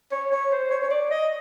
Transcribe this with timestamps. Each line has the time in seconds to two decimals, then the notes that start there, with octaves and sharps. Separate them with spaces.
0.12 C#5
0.32 C#5
0.52 C5
0.71 C#5
0.82 C#5
0.91 D5
1.11 D#5